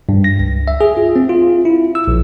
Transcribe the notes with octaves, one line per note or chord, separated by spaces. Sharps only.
G2
A#6
C#2
E5
G#4
F4
C4
F4
E4
E6
A#1